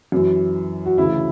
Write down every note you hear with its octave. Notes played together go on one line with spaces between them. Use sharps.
F#2 E3
F#4
D2 C#3 E3 E4